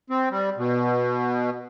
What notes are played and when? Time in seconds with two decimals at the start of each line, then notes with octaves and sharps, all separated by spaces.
0.10 C4
0.31 G3
0.58 B2